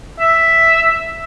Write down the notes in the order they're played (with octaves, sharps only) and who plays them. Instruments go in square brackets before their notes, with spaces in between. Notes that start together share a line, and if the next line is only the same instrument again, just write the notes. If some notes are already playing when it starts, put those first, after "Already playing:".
[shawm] E5